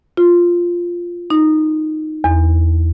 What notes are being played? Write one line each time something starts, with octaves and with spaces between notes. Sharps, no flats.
F4
D#4
E2